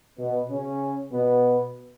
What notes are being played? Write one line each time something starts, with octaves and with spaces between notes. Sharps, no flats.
B2 B3
C#3 C#4
B2 B3